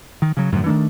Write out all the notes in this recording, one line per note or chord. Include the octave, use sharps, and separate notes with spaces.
D#3
C#3 F#3
F#2 A2 D3 F3
D#3 E3 A3 D4